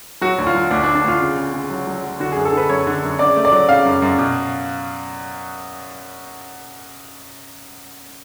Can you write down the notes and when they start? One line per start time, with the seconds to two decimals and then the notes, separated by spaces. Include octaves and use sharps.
0.21 F#3 F#4
0.38 D2
0.47 F4
0.55 F#3
0.71 D2 D4
0.84 D4
0.87 D2
0.95 D4
1.04 D2 F4
1.21 C#3
1.37 C#3
1.53 C#3
1.70 F#3
1.87 F#3
2.04 F#3
2.20 D3 F#4
2.32 F#2 G#4
2.45 A4
2.53 D3 B4
2.69 F#2 C#5
2.87 D3
3.03 F#2
3.19 C#3 D5
3.37 A3
3.45 D5
3.52 F#3
3.69 C#3 F5
3.85 F#2
4.02 F#2
4.18 B2